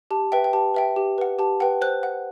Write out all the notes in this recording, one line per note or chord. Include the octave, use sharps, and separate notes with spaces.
G4 A5
B4 E5 G5
G5
G4 A5
B4 E5 G5
G4
B4 F#5
G4 A5
B4 F#5 G5
C5 F#6
F#5